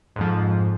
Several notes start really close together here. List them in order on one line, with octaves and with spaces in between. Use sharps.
G#2 F2 F3